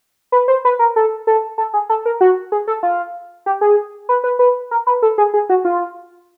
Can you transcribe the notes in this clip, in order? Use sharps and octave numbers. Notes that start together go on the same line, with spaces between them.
B4
C5
B4
A#4
A4
A4
A4
G#4
A4
A#4
F#4
G#4
A4
F4
G4
G#4
B4
B4
B4
A#4
B4
A4
G#4
G#4
F#4
F4